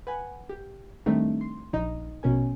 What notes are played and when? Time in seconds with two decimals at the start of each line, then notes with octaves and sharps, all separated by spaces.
0.07 B4 F#5 G#5
0.50 G4
1.06 D#3 G3 A3 C4 D4 D#4
1.41 C6
1.73 A#1 D#4 D#5
2.23 A#1 B2 C#4 A#4 G#5